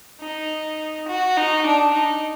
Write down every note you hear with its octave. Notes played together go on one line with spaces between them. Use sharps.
D#4
F#4
D#4
D4
D#4